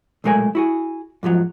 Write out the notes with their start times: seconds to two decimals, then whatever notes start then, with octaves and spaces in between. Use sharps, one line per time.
0.24 B1 A#2 G#3 A3 A#4 G#5
0.55 E4 F#4 G#4
1.23 F2 G#2 F3 F#3